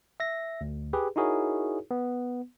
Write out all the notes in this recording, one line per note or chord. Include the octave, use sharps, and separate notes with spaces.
E5 A#6
D2
G4 G#4 B4
D#4 E4 F#4 G#4 A#4 C#5
B3